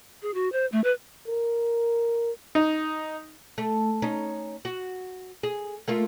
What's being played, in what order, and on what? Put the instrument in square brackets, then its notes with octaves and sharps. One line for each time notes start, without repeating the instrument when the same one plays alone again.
[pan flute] G#4
F#4
C5
A3
B4
[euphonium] A#4
[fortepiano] D#4
[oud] A3
C#4 D#4
F#4
G#4
A3 A#3 F4